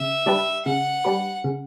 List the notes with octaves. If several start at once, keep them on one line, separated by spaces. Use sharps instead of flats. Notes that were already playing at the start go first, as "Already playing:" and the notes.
Already playing: C#3 E5
G3 D4 G4 B4
C#3 F#5
G3 D4 G4 B4
C#3